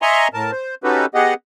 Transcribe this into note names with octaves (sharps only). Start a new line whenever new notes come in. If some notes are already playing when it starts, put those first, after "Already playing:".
D#5 E5 G#5 A#5 C6 C#6
A2 A#4 A5
C5
C#4 D#4 F#4 G4 A4 B4
B3 G4 G#4 D#5 F#5